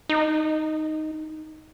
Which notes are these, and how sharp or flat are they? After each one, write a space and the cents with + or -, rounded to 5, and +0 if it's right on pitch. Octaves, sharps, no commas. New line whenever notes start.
D#4 +0